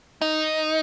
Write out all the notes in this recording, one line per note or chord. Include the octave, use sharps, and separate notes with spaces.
D#4